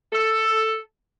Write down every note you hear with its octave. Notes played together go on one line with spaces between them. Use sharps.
A4